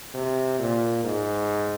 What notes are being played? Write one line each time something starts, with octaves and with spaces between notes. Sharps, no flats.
C3
A#2
G#2